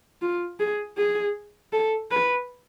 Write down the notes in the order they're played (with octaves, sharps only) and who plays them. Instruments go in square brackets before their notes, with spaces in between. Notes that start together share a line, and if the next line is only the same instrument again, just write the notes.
[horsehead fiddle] F4
G#4
G#4
A4
B4